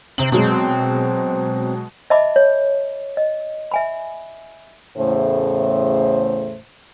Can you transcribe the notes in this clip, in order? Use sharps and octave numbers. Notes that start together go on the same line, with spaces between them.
C3 C4 F#7
B2 F#3 G#3 C4
D#5 E5 A5 B5 D6
C#5
D#5
E5 G#5 B5
E2 A2 C#3 A3 C5